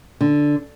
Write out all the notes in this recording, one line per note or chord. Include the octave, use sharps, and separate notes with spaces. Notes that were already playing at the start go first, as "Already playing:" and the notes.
D3